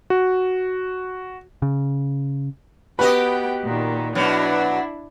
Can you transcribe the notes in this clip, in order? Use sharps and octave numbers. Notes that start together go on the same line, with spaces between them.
F#4
C#3
B3 F#4 G4 B4 D#5 G5
A#2 D#3
B2 F#3 D4 E4